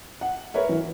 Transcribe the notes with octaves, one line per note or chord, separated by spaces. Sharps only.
F#5
A#4 B4 C#5 E5
E3